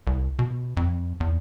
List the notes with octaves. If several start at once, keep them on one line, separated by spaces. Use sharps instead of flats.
C2
B2
F2
E2